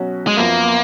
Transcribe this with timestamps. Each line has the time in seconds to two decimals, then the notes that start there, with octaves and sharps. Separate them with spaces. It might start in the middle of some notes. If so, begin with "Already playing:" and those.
Already playing: B2 F#3 C#4 F#4
0.27 G#3
0.37 F#2 F3 A#3 B3